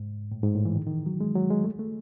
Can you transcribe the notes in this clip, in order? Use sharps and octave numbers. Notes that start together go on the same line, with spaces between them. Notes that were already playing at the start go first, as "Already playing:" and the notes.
Already playing: G#2
A2
G#2
A2
E3
D#3
D#3
E3
F#3
G#3
F#3
G#3
A3
A3